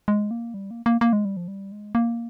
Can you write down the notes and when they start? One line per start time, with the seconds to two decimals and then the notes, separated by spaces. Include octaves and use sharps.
0.08 G#3
0.31 A#3
0.54 G3
0.71 A#3
0.86 A#3
1.01 A#3
1.13 G#3
1.25 G3
1.37 F3
1.48 G3
1.72 G#3
1.95 A#3